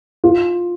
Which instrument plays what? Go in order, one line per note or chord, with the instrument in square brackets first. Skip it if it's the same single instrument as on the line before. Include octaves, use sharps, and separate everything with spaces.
[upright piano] F4